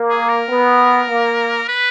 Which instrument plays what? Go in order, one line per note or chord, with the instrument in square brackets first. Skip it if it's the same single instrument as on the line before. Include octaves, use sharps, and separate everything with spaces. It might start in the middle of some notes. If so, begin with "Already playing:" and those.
Already playing: [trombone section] A#3
[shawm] G#4
A#4
[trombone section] B3
A#3
[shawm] B4